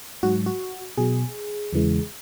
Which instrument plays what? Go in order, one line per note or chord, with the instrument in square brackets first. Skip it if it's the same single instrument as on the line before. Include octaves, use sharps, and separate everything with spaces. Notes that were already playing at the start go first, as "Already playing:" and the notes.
[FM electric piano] G#2 F#3 F#4
F#4
B2 F#3 G#4
E2 C#3 E3 G#3